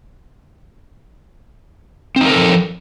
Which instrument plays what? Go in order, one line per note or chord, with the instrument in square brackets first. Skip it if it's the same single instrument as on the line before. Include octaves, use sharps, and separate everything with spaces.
[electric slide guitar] C4
D#4
A#4
A4
F3